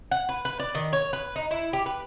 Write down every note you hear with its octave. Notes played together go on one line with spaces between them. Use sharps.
F#5
B4
B4
D5
D#3
C#5
B4
D#4
E4
G4
B4